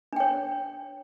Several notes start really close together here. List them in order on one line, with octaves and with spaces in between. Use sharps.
D4 G5 C#5